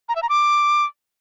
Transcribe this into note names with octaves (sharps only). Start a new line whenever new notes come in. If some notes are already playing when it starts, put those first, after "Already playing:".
A#5
E5
A#5
D6